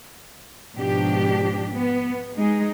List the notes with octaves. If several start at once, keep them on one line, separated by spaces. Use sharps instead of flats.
G#2 B2 F3 D4 G4
B3
G#3 D#4 G#4